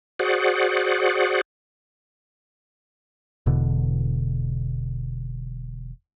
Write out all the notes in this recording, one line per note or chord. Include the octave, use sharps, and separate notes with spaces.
F#4 G#4 C5 D5 F#5
E1 E2 B2 D3